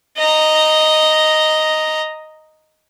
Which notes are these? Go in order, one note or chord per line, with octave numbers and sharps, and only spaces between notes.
D#5 A#5